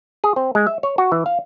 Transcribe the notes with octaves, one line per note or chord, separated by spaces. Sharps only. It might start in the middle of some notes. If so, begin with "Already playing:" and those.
G#4
C4
G#3
E5
C#5
F#4
E3
F5